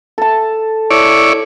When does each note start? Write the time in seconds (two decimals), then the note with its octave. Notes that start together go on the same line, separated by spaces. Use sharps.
0.18 A4 A5
0.91 E4 C#5 D5